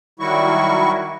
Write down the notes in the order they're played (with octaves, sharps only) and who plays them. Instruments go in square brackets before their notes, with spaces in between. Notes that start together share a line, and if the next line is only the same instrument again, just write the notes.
[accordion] D#3 F#3 G3 E4 F#4 C#6